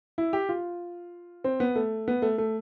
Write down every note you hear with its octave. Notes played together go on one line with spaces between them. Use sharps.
E4
G4
F4
C4
B3
A3
B3
A3
A3